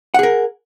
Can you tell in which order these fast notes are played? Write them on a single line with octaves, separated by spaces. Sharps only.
F#5 G#4 A#4